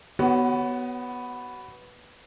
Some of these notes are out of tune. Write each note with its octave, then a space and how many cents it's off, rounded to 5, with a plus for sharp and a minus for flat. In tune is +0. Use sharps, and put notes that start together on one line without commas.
B3 +0 F#4 +35 C#5 +0